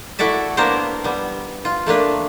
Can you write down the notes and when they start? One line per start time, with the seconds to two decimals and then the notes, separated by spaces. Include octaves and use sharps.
0.19 E4 F#4 A4 D5 E5
0.57 A#3 B3 D4 A#4 C5
1.04 G3 B3
1.65 F4
1.86 A3 A#3 D4 B4